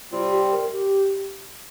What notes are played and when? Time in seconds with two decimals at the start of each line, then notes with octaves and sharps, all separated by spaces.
0.12 C3 G3 C4 F4
0.32 G4
0.52 A#4
0.73 G4